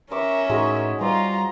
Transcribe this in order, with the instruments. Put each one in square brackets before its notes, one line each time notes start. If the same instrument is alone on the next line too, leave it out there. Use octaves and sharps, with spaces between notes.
[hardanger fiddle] C#4 [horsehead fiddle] A#4 E5 [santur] C#6 D6
[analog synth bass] A2 [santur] G#3 D#4 F#4
[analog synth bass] G3 [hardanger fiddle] F4 [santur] C5 D5 [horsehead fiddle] A#5